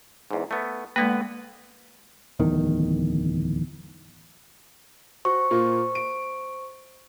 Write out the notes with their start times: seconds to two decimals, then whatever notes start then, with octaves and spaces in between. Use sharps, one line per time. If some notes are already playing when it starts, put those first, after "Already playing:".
0.31 E2 G#2
0.51 A3 B3
0.96 D3 G#3 A#3 B3 B4
2.40 D1 E2 D#3
5.25 F#4 C5 C#6
5.51 A#2 A#3 F4
5.95 D7